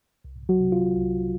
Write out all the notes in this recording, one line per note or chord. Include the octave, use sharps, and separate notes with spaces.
C2
F#3 F#4
C3
F4
C2